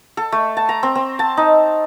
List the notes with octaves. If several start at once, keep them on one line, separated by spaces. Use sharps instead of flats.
A4
A3
A5
A#5
C4
C4
A5
D#4